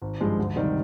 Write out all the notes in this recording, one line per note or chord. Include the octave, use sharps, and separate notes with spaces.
G#1
G2 F3 G#3
D2
C3 D#3 G3